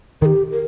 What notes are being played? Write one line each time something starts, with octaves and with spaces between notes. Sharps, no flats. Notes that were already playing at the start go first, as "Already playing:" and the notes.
D#3 G4 A#4
A#4